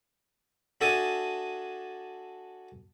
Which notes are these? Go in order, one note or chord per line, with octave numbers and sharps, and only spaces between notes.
D4 F#4 A4 E5 G#5 D#6